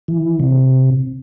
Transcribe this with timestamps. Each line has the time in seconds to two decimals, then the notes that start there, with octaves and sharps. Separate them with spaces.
0.08 E3
0.40 C3